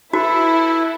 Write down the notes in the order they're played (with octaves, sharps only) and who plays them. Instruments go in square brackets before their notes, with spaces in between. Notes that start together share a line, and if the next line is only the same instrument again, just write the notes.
[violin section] E4 [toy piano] F#4 [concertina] A4 B4